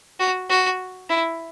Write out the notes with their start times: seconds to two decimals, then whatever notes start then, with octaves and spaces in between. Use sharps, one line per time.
0.20 F#4
0.50 F#4
1.10 E4